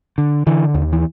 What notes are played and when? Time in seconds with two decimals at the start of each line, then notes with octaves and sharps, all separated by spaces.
0.18 D3
0.47 D3 E3
0.74 D#2
0.92 E3